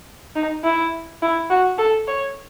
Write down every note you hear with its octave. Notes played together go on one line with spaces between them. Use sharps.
D#4
E4
E4
F#4
A4
C#5